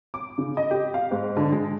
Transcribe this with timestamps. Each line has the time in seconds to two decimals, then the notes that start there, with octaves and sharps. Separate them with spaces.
0.14 D6
0.38 C#3
0.57 D#5
0.71 G4
0.94 F5
1.11 G#2
1.37 D3
1.52 G#3